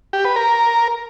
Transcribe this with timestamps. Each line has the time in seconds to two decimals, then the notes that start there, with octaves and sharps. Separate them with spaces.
0.13 G4
0.25 B4
0.36 A#4